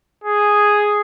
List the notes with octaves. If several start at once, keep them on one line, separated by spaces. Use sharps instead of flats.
G#4